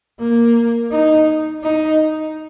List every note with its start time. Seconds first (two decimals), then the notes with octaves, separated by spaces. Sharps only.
0.19 A#3
0.92 D#4
1.63 D#4